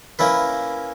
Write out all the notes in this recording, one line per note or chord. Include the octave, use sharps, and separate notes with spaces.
A#3 C#4 E4 B4